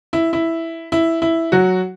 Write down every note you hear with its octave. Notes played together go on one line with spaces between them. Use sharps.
E4
E4
E4
E4
F#3 F#4